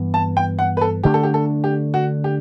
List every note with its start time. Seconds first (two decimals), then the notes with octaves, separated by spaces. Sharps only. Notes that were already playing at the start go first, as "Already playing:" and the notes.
Already playing: G2 E3 B3
0.14 A5
0.37 G5
0.59 F#5
0.77 B4
0.81 A4
1.04 D3 A3 D4 G4
1.14 A4
1.23 G4
1.34 A4
1.64 G4
1.94 F#4
2.24 G4